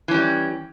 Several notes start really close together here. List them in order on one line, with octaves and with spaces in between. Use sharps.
E3 C#4 G3